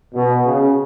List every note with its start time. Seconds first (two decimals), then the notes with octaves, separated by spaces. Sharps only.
0.14 B2
0.46 C#3